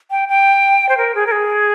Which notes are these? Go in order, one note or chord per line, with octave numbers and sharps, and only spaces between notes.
G5
G5
C5
A#4
G#4
A#4
G#4